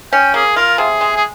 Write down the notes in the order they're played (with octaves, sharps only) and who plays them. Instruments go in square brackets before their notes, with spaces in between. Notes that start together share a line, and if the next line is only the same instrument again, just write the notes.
[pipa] C#4 [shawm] G5
[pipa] A#3 [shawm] G#4
[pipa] F4 [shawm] A#4
[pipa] C3 [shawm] G#4
[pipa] G#3
[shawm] G#4